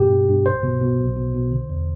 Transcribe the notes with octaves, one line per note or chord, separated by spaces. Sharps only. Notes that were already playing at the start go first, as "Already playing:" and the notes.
Already playing: G2 B2 G4
G2
G2
B1 C5
B2
B2
B1
B2
B2
D3
E2